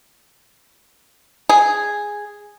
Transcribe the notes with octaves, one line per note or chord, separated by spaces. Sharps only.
G#4